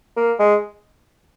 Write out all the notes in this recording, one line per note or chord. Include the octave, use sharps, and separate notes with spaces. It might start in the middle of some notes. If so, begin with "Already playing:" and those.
A#3
G#3